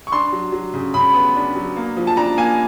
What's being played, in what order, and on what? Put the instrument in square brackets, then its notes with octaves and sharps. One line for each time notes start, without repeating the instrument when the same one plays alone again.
[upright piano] C#6
D4 C6
F#3
F#3
C#3
C#3 B5
B3
D4
F#3
A#3
F3
A5
D4 A#5
A#3 G#5